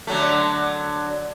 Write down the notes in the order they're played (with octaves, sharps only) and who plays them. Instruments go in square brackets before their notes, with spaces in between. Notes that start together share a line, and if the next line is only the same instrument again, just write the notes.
[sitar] D3 F#3 A3